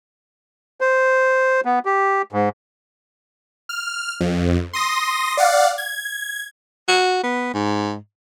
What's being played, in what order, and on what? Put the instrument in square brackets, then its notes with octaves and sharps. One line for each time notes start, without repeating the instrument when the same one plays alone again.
[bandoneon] C5
B3
G4
G#2
[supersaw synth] F6
F2
C6 D#6 A#6
D5 F5 F#5
G#6
[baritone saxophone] F#4
B3
G#2